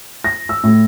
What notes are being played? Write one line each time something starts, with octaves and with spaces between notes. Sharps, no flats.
A#6
E6
A2